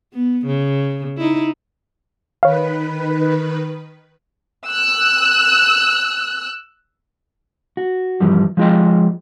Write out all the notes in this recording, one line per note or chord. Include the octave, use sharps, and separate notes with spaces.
B3
C#3
D#4 E4
D#3 B4 C#5 F5
E6 F#6
F#4
G2 E3 F3 G3
F3 G#3 F4 D#5 G5